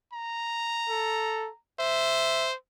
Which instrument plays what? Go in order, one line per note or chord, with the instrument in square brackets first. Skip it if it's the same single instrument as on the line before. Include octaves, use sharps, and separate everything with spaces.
[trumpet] A#5
[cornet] A4
[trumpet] C5 [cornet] E5